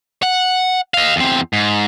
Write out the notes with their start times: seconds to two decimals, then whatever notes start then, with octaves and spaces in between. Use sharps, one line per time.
0.22 F#5
0.94 D#5 F5
1.16 E2 C4
1.53 G#2